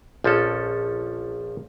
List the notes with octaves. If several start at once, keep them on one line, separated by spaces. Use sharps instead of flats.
A#1 F3 C#4 A4